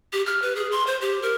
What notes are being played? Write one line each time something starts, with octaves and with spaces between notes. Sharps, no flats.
G4
F6
B4
G#4
C6
C5
G4
A#4